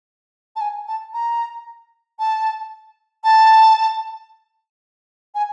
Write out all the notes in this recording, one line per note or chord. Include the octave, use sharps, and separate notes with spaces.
A5
G#5
A5
A#5
A5
A5
G#5